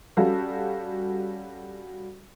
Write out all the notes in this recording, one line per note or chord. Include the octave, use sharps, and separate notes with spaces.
G3 C#4 F#4 A4 F5